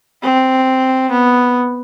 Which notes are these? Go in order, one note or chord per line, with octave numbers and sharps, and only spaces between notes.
C4
B3